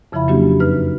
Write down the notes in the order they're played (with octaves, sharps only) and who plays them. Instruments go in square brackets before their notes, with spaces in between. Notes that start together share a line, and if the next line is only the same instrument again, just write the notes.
[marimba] F2 C#3 F3 E4 E5 B5
F#3 A#3 C#4 D4 F#4 G4
F#2 D#4 B4 F6